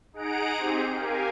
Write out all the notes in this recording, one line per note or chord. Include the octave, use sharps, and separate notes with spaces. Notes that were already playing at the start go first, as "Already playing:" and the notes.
D#4 G#4 F#5 A#5 D7
C4 D#4 G4 G#4 C5
G4 A#4 F5 G#5